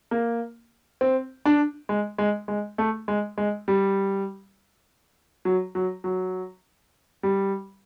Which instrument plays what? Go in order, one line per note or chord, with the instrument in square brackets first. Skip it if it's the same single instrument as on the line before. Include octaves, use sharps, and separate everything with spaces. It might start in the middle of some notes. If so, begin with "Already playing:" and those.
[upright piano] A#3
C4
D4
G#3
G#3
G#3
A3
G#3
G#3
G3
F#3
F#3
F#3
G3